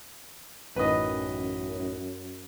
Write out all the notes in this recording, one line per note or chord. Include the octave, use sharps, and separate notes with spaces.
A1 F#2 D#3 B4 D#5